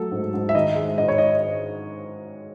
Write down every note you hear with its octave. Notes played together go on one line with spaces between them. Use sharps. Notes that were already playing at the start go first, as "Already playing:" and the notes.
Already playing: F#3 A3 A4
G#2
G#2
E5
D#3 D#5
G#3
G#2 D#5
C#5
D#5